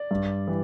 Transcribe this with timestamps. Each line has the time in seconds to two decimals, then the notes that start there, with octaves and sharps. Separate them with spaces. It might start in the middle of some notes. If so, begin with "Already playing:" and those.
Already playing: D5
0.11 G2
0.47 E3 G3